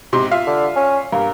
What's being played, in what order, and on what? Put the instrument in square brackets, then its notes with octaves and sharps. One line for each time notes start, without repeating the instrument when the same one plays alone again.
[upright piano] G#2 C3 C6
F4 E5 F5
[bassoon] D3
C#4
[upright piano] G2 [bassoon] A#3